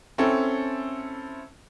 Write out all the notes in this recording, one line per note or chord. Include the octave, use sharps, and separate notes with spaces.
C4 C#4 E4 A4